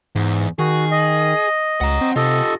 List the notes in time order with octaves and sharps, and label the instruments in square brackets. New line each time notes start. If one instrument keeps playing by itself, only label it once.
[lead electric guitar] E2 [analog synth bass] G#2
[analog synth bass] D#3 [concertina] F#4 [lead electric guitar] G#4
[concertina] D#5
[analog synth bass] C#2 [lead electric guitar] F#5 A#5
[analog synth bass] C4
[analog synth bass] C3 [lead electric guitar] F4 G4 [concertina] A4 D#5